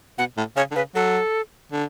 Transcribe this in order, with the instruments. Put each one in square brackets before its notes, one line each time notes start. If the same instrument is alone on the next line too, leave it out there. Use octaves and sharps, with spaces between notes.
[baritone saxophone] B2 [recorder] F#5
[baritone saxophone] A2
[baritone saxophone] C#3 [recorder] C#5
[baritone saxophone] D3
[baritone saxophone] C#3 [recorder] B4
[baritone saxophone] F#3 [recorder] A4
[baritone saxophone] D3